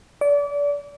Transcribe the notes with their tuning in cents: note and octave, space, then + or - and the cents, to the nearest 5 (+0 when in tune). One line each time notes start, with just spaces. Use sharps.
D5 -30